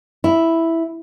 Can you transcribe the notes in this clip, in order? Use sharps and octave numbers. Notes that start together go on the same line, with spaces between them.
E4